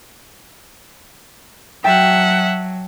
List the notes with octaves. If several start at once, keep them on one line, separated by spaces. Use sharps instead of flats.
F#3 E5 F#5 G5 A5